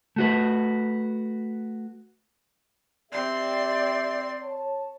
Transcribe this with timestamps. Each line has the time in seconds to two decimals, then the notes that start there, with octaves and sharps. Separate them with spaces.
0.16 A3 F#4 B4
3.12 C4 G4 D5 E5 C6
4.43 C#5 A5